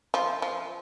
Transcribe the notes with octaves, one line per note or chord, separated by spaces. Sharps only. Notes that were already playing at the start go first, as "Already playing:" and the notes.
F3
F3